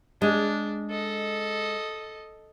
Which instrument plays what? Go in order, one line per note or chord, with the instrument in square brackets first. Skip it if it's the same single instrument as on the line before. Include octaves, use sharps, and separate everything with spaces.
[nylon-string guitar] G#3 [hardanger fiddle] D4
[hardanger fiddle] A4 D#5